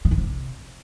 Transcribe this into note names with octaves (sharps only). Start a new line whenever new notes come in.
D3
D#3
C3